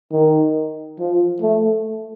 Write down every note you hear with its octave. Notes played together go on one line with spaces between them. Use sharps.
D#3
F3
A3